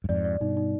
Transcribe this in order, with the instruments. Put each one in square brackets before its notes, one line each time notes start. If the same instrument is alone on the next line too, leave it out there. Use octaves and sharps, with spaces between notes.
[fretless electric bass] G2
[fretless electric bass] F2 G#2 [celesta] D5
[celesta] D5
[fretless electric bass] G2 B2 [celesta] D#4
[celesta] D#4